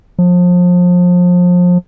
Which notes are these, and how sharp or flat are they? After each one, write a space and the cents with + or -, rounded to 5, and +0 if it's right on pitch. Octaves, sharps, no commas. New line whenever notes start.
F3 +30